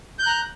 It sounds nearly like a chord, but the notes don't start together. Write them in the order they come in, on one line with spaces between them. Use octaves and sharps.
G6 F#6 A#5